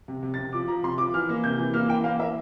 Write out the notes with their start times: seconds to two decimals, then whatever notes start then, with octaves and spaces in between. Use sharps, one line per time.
0.08 C3
0.23 C3
0.34 A6
0.38 C3
0.53 F3 D6
0.68 F3 A#5
0.83 C3 C6
0.98 F3 D6
1.14 E3 F6
1.29 A#3
1.44 C3 G6
1.59 E3
1.73 A#3 F6
1.89 E3 G5
2.04 A#3 F5
2.19 A#3 E5